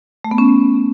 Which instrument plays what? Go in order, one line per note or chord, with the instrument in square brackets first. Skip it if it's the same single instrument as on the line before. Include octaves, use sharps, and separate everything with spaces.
[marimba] A3
B3
C#4